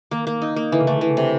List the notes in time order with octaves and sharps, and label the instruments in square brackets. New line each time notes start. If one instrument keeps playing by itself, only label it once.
[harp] D#3 [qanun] A#3
[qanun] A#3
D#4
A#3
[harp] D3 [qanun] E3
[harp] C#3
[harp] D3 [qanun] A3
[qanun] E3
C3